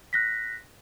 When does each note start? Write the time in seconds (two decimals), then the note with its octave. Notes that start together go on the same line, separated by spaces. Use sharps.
0.13 F#6 A#6 B6